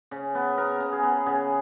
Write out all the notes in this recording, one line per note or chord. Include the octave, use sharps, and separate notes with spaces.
C#3
B3
B3 A#4
C#3
G#4
B3
C#3 G#4